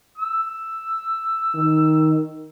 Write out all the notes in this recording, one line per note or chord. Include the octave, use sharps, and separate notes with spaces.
E6
D#3